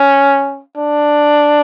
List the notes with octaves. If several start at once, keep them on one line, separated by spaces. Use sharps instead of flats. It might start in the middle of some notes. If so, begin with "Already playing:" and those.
Already playing: C#4
D4